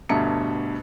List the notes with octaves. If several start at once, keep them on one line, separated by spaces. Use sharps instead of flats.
D2 G2 B2 E5 A#5 C#7